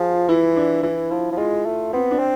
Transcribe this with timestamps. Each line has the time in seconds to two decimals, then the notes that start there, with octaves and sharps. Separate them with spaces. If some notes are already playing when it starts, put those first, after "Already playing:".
Already playing: F3 G#4
0.11 F4
0.28 E3 E4
0.56 D4
0.83 E3 E4
1.11 F3 E4
1.32 F3
1.37 G#3 F4
1.66 A3
1.93 B3 C4
2.11 D4
2.19 C4